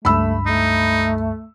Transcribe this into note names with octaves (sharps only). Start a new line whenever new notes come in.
C#2 G2 A3 B5 E6
A3 D#4